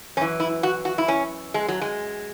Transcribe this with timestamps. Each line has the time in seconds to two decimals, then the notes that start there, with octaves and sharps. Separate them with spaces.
0.17 F#2 C#4
0.21 E3
0.40 E4
0.63 F#4
0.85 F#4
0.98 E4
1.08 C#4
1.54 G#3
1.68 F#3
1.81 G#3